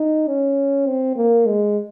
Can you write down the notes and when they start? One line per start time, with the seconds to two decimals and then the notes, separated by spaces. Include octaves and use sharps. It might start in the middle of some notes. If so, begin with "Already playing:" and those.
Already playing: D#4
0.27 C#4
0.87 C4
1.16 A#3
1.46 G#3